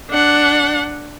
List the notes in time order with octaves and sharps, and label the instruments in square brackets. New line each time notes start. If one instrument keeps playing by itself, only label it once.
[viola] D4 F#5